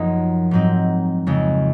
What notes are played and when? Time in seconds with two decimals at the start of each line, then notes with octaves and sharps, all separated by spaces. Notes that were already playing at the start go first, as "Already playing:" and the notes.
Already playing: F#2 F3 A#3 D#4
0.51 G#2 F#3 C4 D#4
1.27 F2 C#3 G#3 C#4